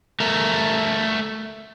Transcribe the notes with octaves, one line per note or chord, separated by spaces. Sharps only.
A3 A#4